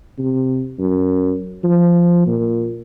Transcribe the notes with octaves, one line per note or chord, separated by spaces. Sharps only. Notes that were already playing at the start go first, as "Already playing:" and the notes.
C3
F#2
F3
A#2